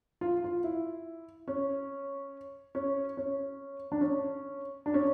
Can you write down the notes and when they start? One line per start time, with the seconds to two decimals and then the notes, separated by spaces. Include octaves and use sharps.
0.21 F4
0.44 F4
0.64 E4
1.48 C#4
2.75 C#4
3.17 C#4
3.92 D4
4.01 C#4
4.86 D4
4.94 C#4